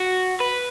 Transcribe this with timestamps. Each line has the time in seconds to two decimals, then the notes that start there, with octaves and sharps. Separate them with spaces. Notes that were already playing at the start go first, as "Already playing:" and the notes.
Already playing: F#4
0.40 B4